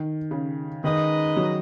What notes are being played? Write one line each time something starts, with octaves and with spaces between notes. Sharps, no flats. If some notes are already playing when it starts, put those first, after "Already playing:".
Already playing: D#3
C#3
D#3 G#3 D#4 B4 D#5
F#3